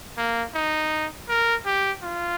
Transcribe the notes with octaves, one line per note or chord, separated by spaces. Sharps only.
A#3
D#4
A#4
G4
F4